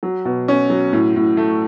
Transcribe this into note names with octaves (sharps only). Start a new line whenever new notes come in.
F#3
B2
C#4
F#3
A2
A2
A3